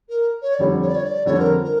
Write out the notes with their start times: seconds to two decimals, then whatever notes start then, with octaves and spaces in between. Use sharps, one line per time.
0.09 A#4
0.42 C#5
0.54 D5
0.59 F2 D3 G3 C#5
0.82 C#5
0.88 D5
0.95 C#5
1.04 D5
1.25 F2 D3 G3 C#5
1.38 A#4
1.64 A#4